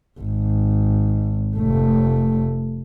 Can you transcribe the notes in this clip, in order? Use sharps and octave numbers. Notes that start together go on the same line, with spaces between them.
G#1
F1 A3